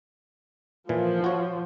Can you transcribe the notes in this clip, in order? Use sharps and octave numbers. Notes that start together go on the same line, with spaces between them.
A#2 E3 F3
F#4 C#5